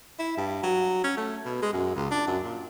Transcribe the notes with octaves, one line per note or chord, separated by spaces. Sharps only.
E4
G2
F#3
C#4
A3
B2
G#3
F#2
C#2
D4
F#2
A#2